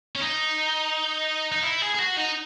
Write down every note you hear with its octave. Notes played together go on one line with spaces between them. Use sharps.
C#4
D#4
D#4
E4
G#4
G#4
F#4
D#4